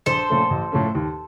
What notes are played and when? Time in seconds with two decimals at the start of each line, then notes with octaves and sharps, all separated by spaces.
0.06 A#1 A4 C5
0.29 A#2 F3 A3 C#4
0.50 A1
0.72 A2 F3 A3 C#4
0.95 D#2